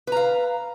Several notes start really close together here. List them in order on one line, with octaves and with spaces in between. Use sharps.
B4 A#5 F5